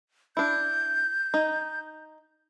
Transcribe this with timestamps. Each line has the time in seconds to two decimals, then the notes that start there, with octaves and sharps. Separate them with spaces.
0.37 D4 E4 G6
1.34 D#4